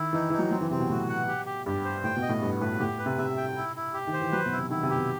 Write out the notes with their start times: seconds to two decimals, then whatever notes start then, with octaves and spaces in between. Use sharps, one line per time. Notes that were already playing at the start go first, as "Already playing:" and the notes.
Already playing: D#3 E4
0.13 E3 D#4
0.30 E3 D#4
0.39 F#3
0.51 F#3 C4
0.61 E3
0.70 C3 C4
0.80 B2
0.89 A2 F#4
1.09 F#5
1.28 G4
1.46 G4
1.66 G2 G4
1.85 C5
2.04 A2 G5
2.16 B2
2.22 D#5
2.29 A2
2.41 G2 B3
2.60 A2 B4
2.80 A2 G4
2.99 B4
3.06 C3
3.18 C3 E5
3.37 G5
3.57 E4
3.76 E4
3.94 G4
4.07 D#3
4.13 C5
4.20 E3
4.32 F#3 B4
4.46 B2
4.52 E4
4.58 C3
4.70 D#3 E4
4.83 C3
4.90 G4
4.96 B2